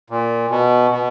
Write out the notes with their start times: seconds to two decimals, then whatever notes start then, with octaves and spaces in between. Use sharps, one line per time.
0.10 A#2
0.51 B2
0.91 B2